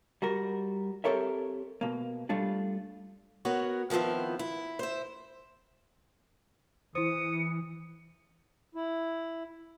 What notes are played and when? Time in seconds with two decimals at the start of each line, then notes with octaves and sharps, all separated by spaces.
0.22 G3 F#4 A#4
1.04 C4 G4 A4 A#4 C#5 E5
1.81 B2 A#3
2.29 G3 A3 D4 F4
3.45 B3 F#4 A#4 C#5
3.90 D#3 F3 B3 C4 E4
4.39 E4
4.79 C5 E5
6.95 E3 E4 C5 D#6 C#7
8.75 E4